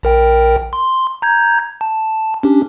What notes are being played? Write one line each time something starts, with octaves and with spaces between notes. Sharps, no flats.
A#1 A#4 G5
C6
A#5 G6 G#6
A5
C#4 D4 G4